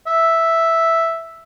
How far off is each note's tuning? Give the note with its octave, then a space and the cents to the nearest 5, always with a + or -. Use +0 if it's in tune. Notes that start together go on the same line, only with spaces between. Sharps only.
E5 +0